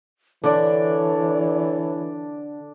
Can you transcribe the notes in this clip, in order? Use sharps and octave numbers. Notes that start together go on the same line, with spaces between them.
D3 E3 D4 C#5 D5